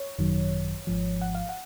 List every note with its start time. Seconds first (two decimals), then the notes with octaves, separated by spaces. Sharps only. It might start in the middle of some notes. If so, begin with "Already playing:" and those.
Already playing: C#5
0.19 G#1 F#2 D#3 F#3
0.87 G#1 G#2 F3
1.21 F#5
1.35 F5
1.49 F#5